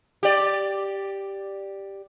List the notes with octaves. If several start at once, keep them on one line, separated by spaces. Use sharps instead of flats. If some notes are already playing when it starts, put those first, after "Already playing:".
G4 D5